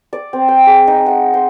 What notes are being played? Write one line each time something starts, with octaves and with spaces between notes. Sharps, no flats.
D5
C4
G5
G#4
D#4
F#5
C6